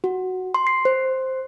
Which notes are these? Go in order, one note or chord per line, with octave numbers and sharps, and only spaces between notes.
F#4
C6
C7
C5